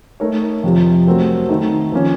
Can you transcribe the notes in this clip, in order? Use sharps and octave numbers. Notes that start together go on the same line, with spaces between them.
A3 D#4 A#4 C#5
F2 C3 F3
F#3 A3 C4 F#4 A#4
D#3 A3 D#4
F3 A#3 C#4